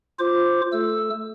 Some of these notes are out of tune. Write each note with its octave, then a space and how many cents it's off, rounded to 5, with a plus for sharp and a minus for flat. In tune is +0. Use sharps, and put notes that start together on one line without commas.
F4 +0 C5 +0 D6 +0
A3 +0 A4 -10 E6 +0